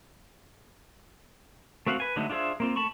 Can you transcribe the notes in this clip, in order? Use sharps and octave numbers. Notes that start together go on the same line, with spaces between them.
A3 C4 F#4 F5 F#5
B4 G#5
D3 F#3 G#3 A3 D#4
D4 F4 G#4 C5 E5
A#3 C4 F4
A3 A5 B5 C#6